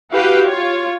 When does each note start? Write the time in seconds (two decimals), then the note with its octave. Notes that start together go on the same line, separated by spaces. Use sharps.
0.12 E4 F#4 G4 B4 F5 G5
0.46 F4 C#5